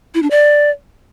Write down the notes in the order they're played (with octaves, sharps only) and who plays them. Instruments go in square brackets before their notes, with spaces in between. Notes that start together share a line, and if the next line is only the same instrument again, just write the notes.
[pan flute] E4
D4
D5